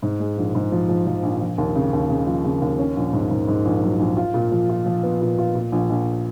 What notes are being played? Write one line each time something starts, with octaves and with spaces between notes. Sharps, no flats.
G#2
G#3
A#1
G#2
F3
F3
F3
A#1
F3
D#2
C#3
D#2
C#3
F3
C#3
D#2
C#4
A#1
G#2
G#2
G#2
A#1
F#3
A#1
F4
A#2
F3
F4
F3
B3
A#2
F4
A#2
A#1
A#1